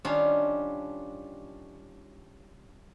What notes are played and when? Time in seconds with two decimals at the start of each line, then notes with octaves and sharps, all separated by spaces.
0.05 D#3 G3 C#4 D4 F4